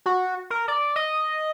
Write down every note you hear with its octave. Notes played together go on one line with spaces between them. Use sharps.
F#4
A#4
D5
D#5